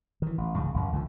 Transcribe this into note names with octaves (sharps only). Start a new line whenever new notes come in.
D#3 E3
A1
C#2 G2 C#3
A1 F#2
C#2 D3 D#3 F3